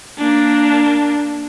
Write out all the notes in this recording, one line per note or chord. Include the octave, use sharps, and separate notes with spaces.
A#3 D4